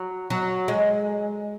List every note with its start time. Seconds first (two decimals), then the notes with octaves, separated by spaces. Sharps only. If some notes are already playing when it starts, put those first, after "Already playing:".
Already playing: F#3
0.30 F#3
0.68 G#3